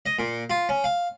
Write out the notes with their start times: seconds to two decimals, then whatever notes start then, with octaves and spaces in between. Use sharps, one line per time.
0.06 D#5
0.19 A#2
0.50 F4
0.69 C#4
0.84 F5